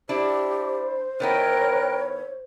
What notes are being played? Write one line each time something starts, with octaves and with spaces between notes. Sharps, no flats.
D4 E4 G4 C5
D#3 B3 E4 A#4 C#5 G5 F#6